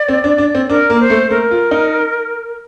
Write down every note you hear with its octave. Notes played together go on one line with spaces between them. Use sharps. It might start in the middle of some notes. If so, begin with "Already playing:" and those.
Already playing: D5
C4
D4
D4
C4
D4 A#4
A#3
C5
A3
A3 A#4
F4
D#4